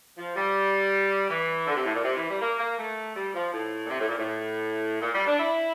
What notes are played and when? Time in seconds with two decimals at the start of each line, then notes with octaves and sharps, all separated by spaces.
0.17 F3
0.36 G3
1.29 E3
1.67 D3
1.76 C3
1.85 A2
1.94 A#2
2.04 C3
2.16 E3
2.29 G3
2.40 A#3
2.59 A#3
2.78 A3
3.16 G3
3.34 F3
3.52 A2
3.84 A#2
3.89 C3
3.99 A2
4.08 A#2
4.17 A2
5.01 A#2
5.14 G3
5.26 D4
5.39 E4